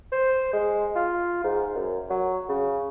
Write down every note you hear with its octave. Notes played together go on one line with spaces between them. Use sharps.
C5
G#3
F4
G#2
F#2
F#3
C#3